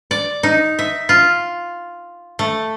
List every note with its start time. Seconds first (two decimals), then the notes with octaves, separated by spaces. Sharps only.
0.11 D5
0.43 D#4
0.79 E5
1.09 F4
2.39 A3